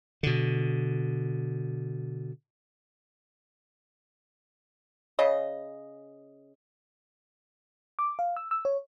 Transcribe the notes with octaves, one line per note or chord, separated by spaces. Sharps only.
B2 D3
C#3 D#5
D6
F5
E6
E6
C#5